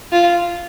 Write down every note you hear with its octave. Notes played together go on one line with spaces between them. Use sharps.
F4